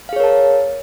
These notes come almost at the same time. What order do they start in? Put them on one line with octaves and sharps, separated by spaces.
F5 G#4 C#5 A#4 A5